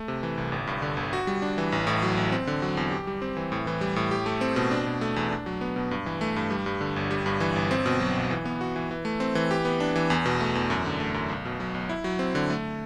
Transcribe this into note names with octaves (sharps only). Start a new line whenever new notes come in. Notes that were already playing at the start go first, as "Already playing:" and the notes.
Already playing: A3
C3
E3
C2
G1
G2
D3
G1
F#4
G3
D4
E3
A1
A2
F#3
A1
C4
D3
F#3
E2
G4
G3
C4
E3
A2
E3
G3
A2
G4
A3
C4
B2
D4
B2
A3
E2
D4
F#3
B3
B2
G2
E3
A3
G2
G3
G2
D3
G1
G3
G2
E3
G1
C4
B2
F#3
B1
E3
B3
F#4
E3
E3
A3
C4
E3
G4
B3
D4
E3
E2
B2
A3
E2
F#2
D3
A3
F#2
B1
B2
F#3
B1
E4
F#3
C4
D3
A3